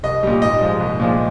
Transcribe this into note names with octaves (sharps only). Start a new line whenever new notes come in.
C2 D#5
A#2 G3
G#2 D#5
F3 G#3
C2
A#2 F3 G#3